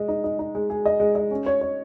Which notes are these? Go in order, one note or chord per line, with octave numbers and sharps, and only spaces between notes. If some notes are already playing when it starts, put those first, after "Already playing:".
Already playing: G#3 D#5
D#4
D#4
D#4
G#3
G#4
D#5
G#3
D#5
C#4
C#5
C#5